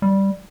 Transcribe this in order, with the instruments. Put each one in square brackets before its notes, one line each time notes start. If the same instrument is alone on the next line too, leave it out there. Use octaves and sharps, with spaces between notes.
[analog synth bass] G3